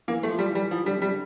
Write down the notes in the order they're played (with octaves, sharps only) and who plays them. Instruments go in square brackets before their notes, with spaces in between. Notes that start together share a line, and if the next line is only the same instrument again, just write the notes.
[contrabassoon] E3 [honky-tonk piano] A#3
[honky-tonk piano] A3
[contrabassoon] F3
[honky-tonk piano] G3
[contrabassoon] E3
[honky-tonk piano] G3
[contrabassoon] E3 [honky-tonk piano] F3
[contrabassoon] D3 [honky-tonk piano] G3
[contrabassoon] C3 [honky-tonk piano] G3
[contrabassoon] D3